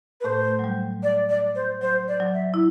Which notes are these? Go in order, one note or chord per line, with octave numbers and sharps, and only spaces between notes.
B4
A2 A3 C5
F#3
G3
D5
D5
C5
F#3 C5
D5
F#3
E5
E4